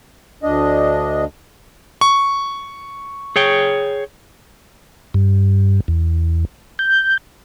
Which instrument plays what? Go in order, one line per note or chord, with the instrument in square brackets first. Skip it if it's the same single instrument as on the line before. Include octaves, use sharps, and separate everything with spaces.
[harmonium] D2 D4 D#5
[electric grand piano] C#6
[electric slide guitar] G#4 C#5 G5
[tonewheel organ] G2
E2
G6